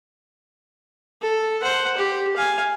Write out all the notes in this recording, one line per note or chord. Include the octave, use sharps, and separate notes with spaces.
A4
C5 F#5
G4
F5 G#5